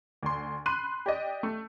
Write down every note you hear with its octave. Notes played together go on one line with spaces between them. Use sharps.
D2 C6
B5 C6 F#6 D#7
G4 D5 D#5
A3